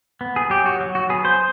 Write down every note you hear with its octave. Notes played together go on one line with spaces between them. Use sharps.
B3
G#4
F#3 G4
F#4
F#3
F#4
B3 G#4
C5